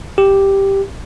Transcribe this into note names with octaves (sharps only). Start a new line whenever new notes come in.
G4